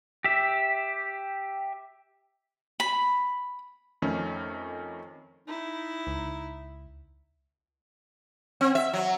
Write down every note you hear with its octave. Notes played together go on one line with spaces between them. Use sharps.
G4 E5
B5
F2 D#3 A3 C#4
D#4 E4
C#2
C4
E5
F#3